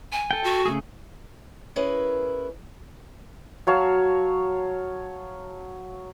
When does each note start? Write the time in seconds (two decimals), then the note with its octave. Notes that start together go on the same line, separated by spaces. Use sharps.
0.12 G#5
0.31 A4 G5
0.43 F#4
0.66 C#3 A3 G#4
1.76 C#4 E4 G#4 A#4 B4
3.67 F#3 C#5 F5 A5